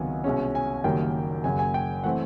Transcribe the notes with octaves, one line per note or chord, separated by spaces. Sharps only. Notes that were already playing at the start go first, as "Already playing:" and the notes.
Already playing: C#2 C3 D#3 F#3 B3 G#5
C2 B2 G#3 C#4
G#5
F#1 F#2 D#3 G3 A#3 G5
F#1 F#2 C#3 G#5
G#5
G5
E3 A3 C4 F#5